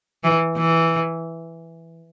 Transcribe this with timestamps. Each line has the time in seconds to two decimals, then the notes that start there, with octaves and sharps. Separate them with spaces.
0.24 E3
0.58 E3